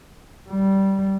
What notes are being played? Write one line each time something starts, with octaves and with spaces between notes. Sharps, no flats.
G3